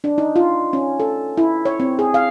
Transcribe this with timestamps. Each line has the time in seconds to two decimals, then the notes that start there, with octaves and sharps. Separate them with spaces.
0.04 D4
0.18 D#4
0.36 F4
0.73 C#4
1.00 A4
1.37 E4
1.65 C#5
1.80 C4
1.99 G#4
2.14 F5